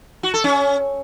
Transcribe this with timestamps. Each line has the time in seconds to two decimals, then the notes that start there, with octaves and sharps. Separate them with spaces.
0.23 F#4
0.34 A4
0.44 C#4